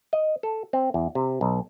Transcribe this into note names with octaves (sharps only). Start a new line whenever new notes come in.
D#5
A4
C4
E2
C3
B1